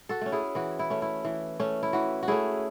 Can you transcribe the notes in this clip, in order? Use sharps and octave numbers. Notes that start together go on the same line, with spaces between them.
F#4 A4
A3 C#4
E4 G#4
E3 F#4
E4
A3 C#4
E4
E3
A3 C#4
E4
E3 F#4
F#4
A3 C#4 E4 G#4